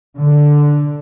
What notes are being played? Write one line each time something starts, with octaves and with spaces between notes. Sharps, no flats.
D3